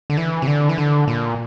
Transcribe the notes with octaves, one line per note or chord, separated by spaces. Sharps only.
D3
E3
C3
D3
E3
D3
A#2